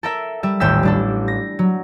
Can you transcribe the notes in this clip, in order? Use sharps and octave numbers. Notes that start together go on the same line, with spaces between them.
A4 A#4 E5
G3 E5
D#1 A1 G5 E6 B6
G3 D4 A4
A#6
F#3